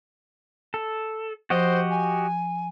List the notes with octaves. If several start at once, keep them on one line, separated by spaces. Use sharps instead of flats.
A4
F3 F#4 G4 C5 D#5
G#5